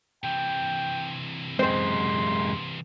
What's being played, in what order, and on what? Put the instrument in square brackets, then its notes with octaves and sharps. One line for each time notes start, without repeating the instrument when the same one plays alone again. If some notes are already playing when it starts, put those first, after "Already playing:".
[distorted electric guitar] C3 E3 [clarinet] G5
[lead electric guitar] F#2 G#3 [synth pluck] C4 C5 [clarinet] C6